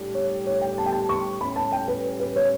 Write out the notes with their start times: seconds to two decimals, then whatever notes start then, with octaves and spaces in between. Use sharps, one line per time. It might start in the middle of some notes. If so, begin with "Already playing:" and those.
Already playing: A2 G3 D4 G4
0.14 C#5
0.46 C#5
0.61 G5
0.78 A5
0.86 G5
0.92 A5
1.09 C#6
1.40 A2 G3 C#4 B5
1.56 A5
1.72 G5
1.88 B4
2.20 B4
2.36 C#5